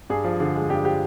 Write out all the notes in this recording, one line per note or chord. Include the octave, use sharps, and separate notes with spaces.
G2 G#4
F3
D3
G#3
G2 G4
F3 G4